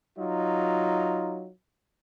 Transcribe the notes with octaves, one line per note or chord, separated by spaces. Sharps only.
F#3 D#4 F4